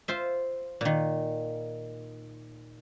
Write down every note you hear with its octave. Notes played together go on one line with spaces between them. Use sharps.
F4 C5 E5
A#2 D#3